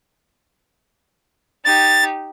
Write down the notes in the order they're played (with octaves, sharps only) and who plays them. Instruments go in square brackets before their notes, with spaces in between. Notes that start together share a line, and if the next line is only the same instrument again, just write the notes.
[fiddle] D#4 G4 [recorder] A6